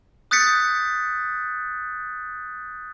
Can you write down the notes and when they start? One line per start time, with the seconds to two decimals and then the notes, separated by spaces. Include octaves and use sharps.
0.31 D#6 F#6 G6 A6 B6 C#7